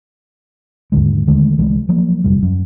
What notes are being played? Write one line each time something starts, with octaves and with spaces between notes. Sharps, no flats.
D#2 G#2 D3 G#3
D3 D#3 G#3 A3
C2 E3 G#3 A3
F3 F#3 A#3
G1 F2 C3 G3
F#2